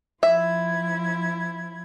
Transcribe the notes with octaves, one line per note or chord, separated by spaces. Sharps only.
F3 E4 E5 G#6